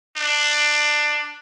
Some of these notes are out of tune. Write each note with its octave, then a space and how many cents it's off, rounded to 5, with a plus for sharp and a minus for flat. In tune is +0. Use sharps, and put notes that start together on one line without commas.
D4 +15